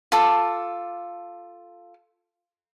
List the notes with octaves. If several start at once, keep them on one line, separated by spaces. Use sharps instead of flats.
F4 A4 D6